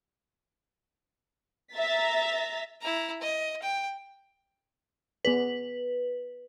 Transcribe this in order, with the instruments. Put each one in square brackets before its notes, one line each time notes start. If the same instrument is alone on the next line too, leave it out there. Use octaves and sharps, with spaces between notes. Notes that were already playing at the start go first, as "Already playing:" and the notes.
[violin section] E5 A#5 A6 B6
[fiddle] E4 A#5
D#5
G5
[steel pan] B3 G#4 D5 [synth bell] B4